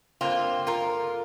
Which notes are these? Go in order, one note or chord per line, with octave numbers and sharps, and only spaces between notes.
G2 D3 A#3 C4 F4
F4 A#4